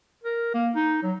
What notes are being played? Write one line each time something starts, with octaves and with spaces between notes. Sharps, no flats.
A#4
A#3
D#4
F#3